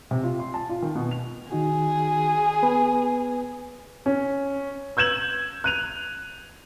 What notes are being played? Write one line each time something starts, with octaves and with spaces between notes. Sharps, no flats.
C3
F4
C6
A5
F4
D#3
B2
F7
D#3 D#4 F#4 G#4
B3 B4
C#4
E6 G6 G#6 E7 F#7
F#6 D#7 F7